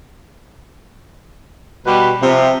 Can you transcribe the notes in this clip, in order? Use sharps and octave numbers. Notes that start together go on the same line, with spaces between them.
B2 G3 B4
C3 F3